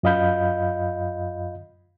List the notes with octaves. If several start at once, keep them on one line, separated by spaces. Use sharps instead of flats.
F#2 F4 D#5 F5 B5 G6